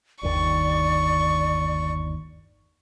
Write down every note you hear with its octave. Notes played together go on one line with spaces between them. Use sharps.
G1 D#2 D#3 D5 C#6